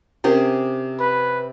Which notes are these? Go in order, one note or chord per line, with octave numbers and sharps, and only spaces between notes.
C3 C#4 G4 G#4 A#4
B4